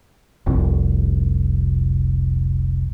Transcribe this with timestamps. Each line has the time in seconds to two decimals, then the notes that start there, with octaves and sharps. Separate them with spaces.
0.46 F1 C2